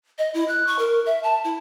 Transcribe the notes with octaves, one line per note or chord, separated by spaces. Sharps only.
D#5
E4
F#6
C#6
A#4
E5
A5
E4